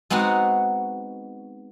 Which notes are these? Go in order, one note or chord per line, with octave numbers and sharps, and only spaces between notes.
G#3 B3 C4 D#4 F#4